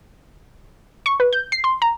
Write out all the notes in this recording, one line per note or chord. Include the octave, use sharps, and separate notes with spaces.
C#6
B4
G6
C7
C6
A#5